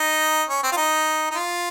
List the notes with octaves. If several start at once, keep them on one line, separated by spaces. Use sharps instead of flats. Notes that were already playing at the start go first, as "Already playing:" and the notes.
Already playing: D#4
C#4
C4
F4
D#4
D#4
F4